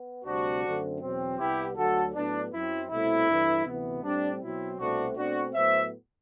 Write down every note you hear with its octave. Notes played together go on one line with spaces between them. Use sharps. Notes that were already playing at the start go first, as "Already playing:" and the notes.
Already playing: B3
D2 C3 G3 C4 D4 F#4
F#2 D3 A3 C4
E2 B2 F#3 C4
C2 C3 G3 B3 E4 G4
D2 D3 F#3 F#4 A4
A2 F#3 B3 D4
F#2 F#3 C4 E4
C2 B2 A3 C4 E4
G2 E3 A3
D2 C3 E3 B3
A2 G3 C4 D4
B2 F#3 C4 E4
C2 B2 A3 C4 D4 F#4
B2 A3 C4 D4 F#4
A2 F#3 B3 C5 E5